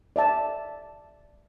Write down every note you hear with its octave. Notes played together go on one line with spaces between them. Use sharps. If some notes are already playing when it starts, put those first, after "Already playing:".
D5 E5 A5